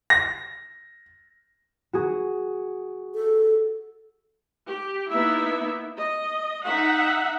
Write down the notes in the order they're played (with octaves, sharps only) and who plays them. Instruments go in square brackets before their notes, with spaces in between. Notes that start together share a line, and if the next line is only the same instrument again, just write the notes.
[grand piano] A#6
[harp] F#4 G#4
[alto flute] A4
[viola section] G4
A#3 B3 D#4 E4 E5
D#5
D#4 E5 F#5